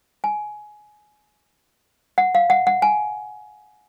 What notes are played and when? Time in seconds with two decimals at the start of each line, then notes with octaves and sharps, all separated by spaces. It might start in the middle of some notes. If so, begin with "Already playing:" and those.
0.24 G#5
2.18 F#5
2.35 F5
2.50 F#5
2.67 F#5
2.82 G#5